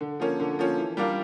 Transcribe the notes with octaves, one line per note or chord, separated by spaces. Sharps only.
D3
F3 A#3 C#4
D3
F3 A#3 C#4
E3
G3 D4 F4 A#4